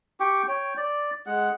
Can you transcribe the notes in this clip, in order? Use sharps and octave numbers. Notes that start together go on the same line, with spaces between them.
G4 G5 C#6 D6
C#5 G5
D5
G#3 F#5